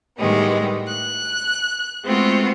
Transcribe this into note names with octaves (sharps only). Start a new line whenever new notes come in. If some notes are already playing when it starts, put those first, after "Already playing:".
A2 D#3 G3 G#3 B3
F#6
G#3 A3 B3 C4 F4 F#4